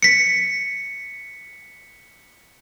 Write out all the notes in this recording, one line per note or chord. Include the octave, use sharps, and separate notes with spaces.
B6 C#7